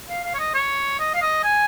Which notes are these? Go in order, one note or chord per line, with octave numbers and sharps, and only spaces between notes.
F5
F5
C#5
D#5
C#5
D#5
F5
D#5
G#5